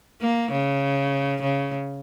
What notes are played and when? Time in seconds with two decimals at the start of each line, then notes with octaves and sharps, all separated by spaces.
0.21 A#3
0.51 C#3
1.42 C#3